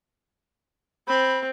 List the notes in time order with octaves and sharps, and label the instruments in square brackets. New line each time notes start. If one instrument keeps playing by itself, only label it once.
[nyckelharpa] C4 [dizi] B5